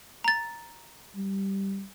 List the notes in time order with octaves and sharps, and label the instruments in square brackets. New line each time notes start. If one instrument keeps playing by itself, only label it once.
[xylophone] A#5 A6
[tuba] G3